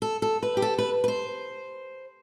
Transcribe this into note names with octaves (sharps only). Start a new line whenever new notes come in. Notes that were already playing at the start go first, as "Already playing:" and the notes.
A4
A4
B4
G4
A4
B4
B4
C5